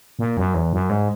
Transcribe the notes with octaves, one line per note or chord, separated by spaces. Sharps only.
A#2
F#2
E2
F#2
G#2